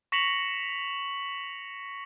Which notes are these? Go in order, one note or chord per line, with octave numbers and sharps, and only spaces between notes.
C#6 A#6 B6 C#7 F7 F#7